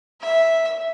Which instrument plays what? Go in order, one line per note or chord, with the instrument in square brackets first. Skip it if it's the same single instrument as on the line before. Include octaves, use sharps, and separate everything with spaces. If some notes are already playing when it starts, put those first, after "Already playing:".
[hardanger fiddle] E5